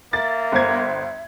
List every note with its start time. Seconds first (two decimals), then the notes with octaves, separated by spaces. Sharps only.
0.13 A#3 E5 A6
0.52 G1 C5 G#6